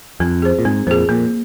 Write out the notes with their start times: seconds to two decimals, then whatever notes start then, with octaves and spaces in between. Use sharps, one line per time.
0.20 F2 C4
0.42 G#4 C5
0.59 A#2
0.65 G#2 C4
0.87 F2 A#2 G#4 C5
1.09 F2 A#2 A#3